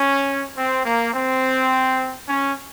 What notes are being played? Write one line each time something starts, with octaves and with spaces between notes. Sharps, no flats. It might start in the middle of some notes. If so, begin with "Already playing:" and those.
Already playing: C#4
C4
A#3
C4
C#4